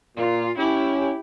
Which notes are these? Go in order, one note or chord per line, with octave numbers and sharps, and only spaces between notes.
A#2 F4
C#4 E4 G4